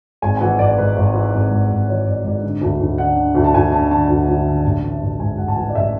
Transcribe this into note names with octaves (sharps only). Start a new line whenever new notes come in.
G#1 G#5
G#5
E3 F#5
G#1 D5
G#2 B4
G#1
E3
G#1
G#2
G#1
E3 C#5
G#1 D5
G#2 D5
D3
D2
D2
D3 F#5
D3
D2
A5
D2 G#5
D3 A5
D3 A5
D2
D2
D3
A1
E3
A1
G#2 G#5
A1 F#5
A5
E3 G#5
D5
A1 E5